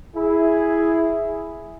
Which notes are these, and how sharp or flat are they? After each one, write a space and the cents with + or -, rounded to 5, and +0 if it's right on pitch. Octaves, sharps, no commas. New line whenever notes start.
E4 +0 G#4 +0